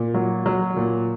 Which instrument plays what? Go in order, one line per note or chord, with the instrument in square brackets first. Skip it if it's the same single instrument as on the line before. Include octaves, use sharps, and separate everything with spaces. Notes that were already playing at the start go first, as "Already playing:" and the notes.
Already playing: [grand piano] A#2
F#3
F#3
A#2